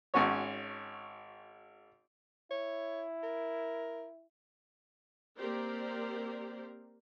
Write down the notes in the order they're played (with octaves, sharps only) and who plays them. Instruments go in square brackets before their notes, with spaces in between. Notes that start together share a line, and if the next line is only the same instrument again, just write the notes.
[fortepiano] G#1 C#4 F#4 C#5
[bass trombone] E4 [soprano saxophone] C#5
[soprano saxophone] A#4
[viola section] A#3 C4 G4 A#4 C5 D5